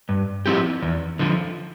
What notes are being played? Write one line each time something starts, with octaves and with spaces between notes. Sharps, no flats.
G2
F3 C4 E4 G4
E2
D3 F3